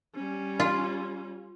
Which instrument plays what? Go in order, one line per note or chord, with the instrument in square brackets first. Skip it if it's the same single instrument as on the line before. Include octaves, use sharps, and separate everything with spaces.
[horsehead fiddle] G3 C#4
[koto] F4